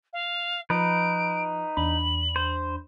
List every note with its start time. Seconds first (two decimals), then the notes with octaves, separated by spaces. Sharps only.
0.13 F5
0.70 F3 D#4 B4 D7
1.77 E2 D4 B5 F#7
2.36 C5